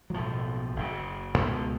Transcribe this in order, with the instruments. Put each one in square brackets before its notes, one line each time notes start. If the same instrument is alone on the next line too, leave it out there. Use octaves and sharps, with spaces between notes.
[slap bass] F#3
B1 A2 F3
F#1 F#2 C#3
C#2 B2 D#3
D3